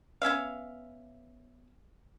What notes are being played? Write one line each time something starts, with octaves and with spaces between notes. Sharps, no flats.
B3 C#4 E5 F5